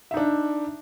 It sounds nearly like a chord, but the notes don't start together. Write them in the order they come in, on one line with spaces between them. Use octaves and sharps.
E5 D#4 D4